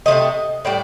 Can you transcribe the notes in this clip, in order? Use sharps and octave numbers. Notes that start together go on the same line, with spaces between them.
F3 A3 D#5
C3
A2 G3 D5